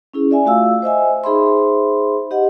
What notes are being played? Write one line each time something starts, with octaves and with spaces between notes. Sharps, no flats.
C#4 E4 G#4
D5 E5 G#5
A3 F4 F#4 F5 E6
C5 D#5 E5 G#5
D#4 G#4 C5 E5 B5 C6
G4 D#5 F#5